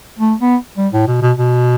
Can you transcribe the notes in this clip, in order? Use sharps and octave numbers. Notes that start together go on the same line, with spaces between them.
A3
B3
G3
A2
B2
B2
B2